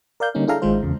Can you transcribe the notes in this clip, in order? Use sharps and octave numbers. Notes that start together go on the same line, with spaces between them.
A#4 D5 F5 G6
D3 G3 A#3 C#4 D#4
D4 E4 G#4 A4 F5 A#5
G#1 G#2 D#3 G#3 F4 C5
E2 C#3